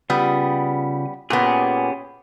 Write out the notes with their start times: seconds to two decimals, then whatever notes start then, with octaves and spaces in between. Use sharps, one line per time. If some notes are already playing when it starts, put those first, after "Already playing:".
0.10 C#3 G3 B3 F4 D#6
1.30 A#2 B3 C#4 G4 G#4